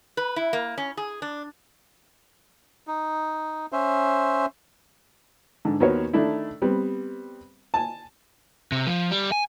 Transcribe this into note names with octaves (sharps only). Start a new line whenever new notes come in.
B4
E4
A#3
C#4
G#4
D4
D#4
C#4 C5 E5
G#2 D3
D#2 B3 F#4 A#4 C5 C#5
D#3 A3 D4 E4
G3 B3 C4
G#5 A5
C3
F3
G3
G#5